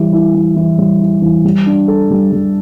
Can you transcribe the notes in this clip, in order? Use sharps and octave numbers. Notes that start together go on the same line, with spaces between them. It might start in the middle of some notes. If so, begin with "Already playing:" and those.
Already playing: E3 G3
E4
E3
E3
G3
E4
E3
G3
D4
A4
G3
G3